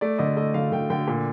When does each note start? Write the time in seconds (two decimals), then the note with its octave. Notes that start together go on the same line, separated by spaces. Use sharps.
0.01 A3 D5
0.19 D3 D#5
0.37 A3 D#5
0.54 D3 F5
0.72 D3 G5
0.90 D3 G5
1.08 A#2